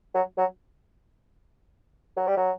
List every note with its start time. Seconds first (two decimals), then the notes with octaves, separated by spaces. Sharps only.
0.15 F#3
0.38 F#3
2.17 F#3
2.27 G3
2.37 F#3